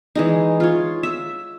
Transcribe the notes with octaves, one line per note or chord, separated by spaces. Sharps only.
E3 G#3 D#4
F4 C#5
E5